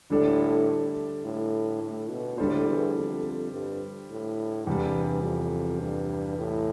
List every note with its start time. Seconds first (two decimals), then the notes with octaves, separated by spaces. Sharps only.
0.10 A2 D3 G3 D4 A4 D5
1.24 A2
1.82 A2
2.10 B2
2.38 A2 D3 G3 D4 A4 C5
2.67 E2
2.96 F2
3.52 G2
4.10 A2
4.67 E2 G2 C3 G3
5.24 F2
5.81 G2
6.38 A2